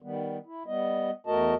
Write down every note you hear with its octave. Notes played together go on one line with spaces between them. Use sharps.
D#3 G3 B3
E4
G3 B3 D#5
E2 A3 F#4 A#4 D#5 A5